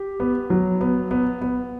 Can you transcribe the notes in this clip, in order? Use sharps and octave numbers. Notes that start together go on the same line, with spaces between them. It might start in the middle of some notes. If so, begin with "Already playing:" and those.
Already playing: G4
B3
F#3
B3
B3
B3